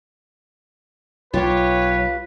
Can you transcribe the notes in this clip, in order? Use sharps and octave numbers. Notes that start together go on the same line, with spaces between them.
B1 F4 G4 B4 C#5